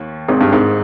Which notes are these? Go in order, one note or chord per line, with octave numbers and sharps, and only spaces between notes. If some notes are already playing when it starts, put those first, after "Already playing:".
Already playing: D#2 D#3
G#1 G#2
G2
G#1 G#2